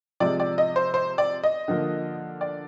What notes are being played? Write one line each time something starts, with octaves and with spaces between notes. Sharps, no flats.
C3 F3 G#3 D5
D5
D#5
C5
C5
D5
D#5
D3 F3 A#3
D5